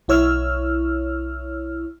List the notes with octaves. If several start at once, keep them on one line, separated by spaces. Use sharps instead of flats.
B1 E4 C#5 E6 F6